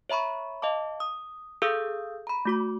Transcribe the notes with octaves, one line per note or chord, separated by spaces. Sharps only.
C#5 E5 A#5 B5 C#6
D#5 F5 A5 D6
D#6
G#4 A4 F5 D#6 E6 G6
A#5 B5
A3 F#4 D6